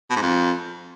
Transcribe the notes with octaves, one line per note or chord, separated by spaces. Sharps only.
B2
G#2
F2